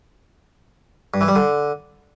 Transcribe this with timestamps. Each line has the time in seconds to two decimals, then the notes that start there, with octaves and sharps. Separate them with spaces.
1.14 G2
1.21 E3
1.28 G3
1.35 D3